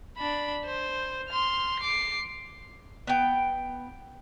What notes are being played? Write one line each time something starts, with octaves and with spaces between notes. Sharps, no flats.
D4 B5
C5
C6 F6
D6 C7
B3 G5